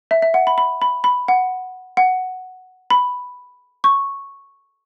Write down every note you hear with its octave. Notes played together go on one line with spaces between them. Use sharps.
E5
E5
F#5
B5
B5
B5
B5
F#5
F#5
B5
C#6